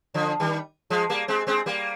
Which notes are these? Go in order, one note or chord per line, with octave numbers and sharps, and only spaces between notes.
D3 F3
D#3 G3
F3 G#3
G3 A#3
G#3 C4
G#3 C4
G3 A#3